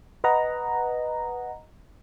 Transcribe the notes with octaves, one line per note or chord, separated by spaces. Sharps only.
B4 D#5 F#5 A#5